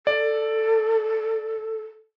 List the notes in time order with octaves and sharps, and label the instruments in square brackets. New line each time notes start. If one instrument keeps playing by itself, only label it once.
[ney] A4 [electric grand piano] D5